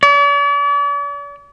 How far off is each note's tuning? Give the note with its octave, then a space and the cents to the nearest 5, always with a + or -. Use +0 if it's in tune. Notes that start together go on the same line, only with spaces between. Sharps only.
D5 -45